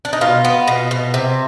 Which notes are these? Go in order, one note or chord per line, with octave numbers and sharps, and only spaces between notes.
D4
D#4
B2 F4
B3
B2
B2
C3